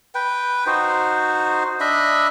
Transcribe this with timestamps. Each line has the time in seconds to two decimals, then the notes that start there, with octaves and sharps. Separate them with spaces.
0.15 B4 G5
0.66 D#4 F#4 C5
1.80 D4 D#5 E5 B5